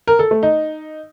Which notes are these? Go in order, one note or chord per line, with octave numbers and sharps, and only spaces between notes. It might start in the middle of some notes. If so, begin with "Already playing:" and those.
A#4
A4
A3
D#4